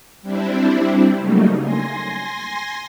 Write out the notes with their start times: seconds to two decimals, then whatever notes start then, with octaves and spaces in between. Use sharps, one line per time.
0.22 G3 C4 D4 E4
1.18 C#3 F#3 G3 A3 A#3 D#4
1.61 G#5 C6 A#6